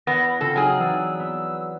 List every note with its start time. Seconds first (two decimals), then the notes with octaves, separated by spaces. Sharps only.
0.07 E2 B3 A#6 D7
0.41 C#3 C4 F4 A4
0.56 F#3 D#4 G#4 G#5 F6
0.79 E3 D5 E6
1.20 B3 E6